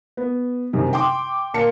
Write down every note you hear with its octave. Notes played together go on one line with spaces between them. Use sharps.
B3
F#2 C3 D#3
G5 C6 D6
A#2 A#4 A5 C#7